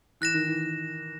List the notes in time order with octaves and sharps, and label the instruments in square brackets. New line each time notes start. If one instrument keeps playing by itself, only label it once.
[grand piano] E3 [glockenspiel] F#6 A#6 E7
[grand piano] D#3
E3